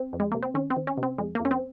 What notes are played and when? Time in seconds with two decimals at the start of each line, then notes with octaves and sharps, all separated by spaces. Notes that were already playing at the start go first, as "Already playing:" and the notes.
Already playing: C4
0.13 F2
0.20 G#3
0.32 C3 A#3
0.43 C4
0.54 D#3 C#4
0.70 C4
0.76 D#3
0.87 C#4
0.97 C3
1.03 C4
1.18 F2 G#3
1.35 F2 A#3
1.45 C#4
1.51 C4